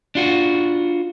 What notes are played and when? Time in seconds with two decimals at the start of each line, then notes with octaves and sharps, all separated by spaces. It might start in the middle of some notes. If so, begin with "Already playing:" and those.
0.15 D4 F4 F#4